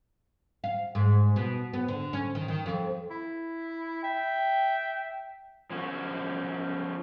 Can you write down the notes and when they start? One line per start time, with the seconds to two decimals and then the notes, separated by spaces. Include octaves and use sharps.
0.64 F5
0.95 G#2
1.36 B2
1.73 B3
1.88 D3
2.13 C#4
2.35 D#3
2.48 D#3
2.66 F2
3.11 E4
4.04 E5 G5
5.70 F3 C#4 F#4